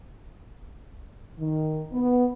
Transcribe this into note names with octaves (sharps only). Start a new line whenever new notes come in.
D#3
B3